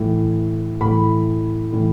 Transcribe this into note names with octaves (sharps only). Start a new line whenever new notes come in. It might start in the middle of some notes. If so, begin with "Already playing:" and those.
Already playing: A2 E3
A2 E3 B5
A2 E3